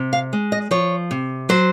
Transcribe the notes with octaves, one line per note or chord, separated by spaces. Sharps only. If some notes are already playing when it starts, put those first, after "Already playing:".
Already playing: C3
F5
G#3
D#5
F3 C#5
C3
F#3 C5